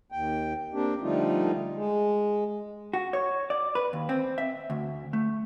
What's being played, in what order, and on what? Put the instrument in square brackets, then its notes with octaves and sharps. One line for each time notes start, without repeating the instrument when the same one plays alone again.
[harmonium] D#2 G5
A#3 C4 D4 G4
D3 F3 G3 A3 D#4 F4
G#3
[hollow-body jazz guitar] F#4
C#5
D5
B4
D#2
C4
E5
D2
A3